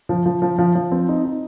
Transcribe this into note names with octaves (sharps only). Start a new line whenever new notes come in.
F3
F3
F3
F3
F3
C4
D#4
D#4